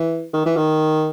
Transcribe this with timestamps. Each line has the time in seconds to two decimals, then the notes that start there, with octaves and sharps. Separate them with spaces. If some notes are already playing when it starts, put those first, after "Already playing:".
Already playing: E3
0.33 D#3
0.46 E3
0.56 D#3